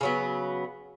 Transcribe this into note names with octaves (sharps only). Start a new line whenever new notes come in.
C#3 F#3 B3